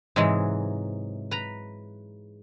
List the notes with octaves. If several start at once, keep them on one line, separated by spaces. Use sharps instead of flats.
G#2 C3 E3 F#3 G#3
B4 A#5